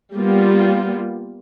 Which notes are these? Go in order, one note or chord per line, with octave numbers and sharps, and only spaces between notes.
G3 A#3 B3 F4